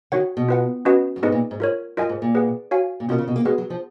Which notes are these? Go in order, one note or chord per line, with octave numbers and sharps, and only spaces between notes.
D#3 F#4 C#5 F#5
B2
F4 B4 F#5
C#4 F#4 B4 D#5 F#5
F#2
G#2 B3 D#4 G#4 B4 D#5
A#2
G#2
F4 A#4 C#5
F#2 F4 A#4 D#5 G#5
G#2
A#2
G#4 B4 F#5
F#4 C#5 F5 G#5
A#2
B2 C#4 F4 A#4
C#3
B2
A#3
G#3 B3 F#4 B4 F#5
F#3
F3